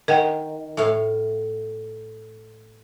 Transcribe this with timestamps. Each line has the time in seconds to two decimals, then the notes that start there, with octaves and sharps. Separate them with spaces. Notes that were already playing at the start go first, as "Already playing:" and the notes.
0.08 D#3 A#4 F#5 G5
0.77 A2 C#5 E5 F5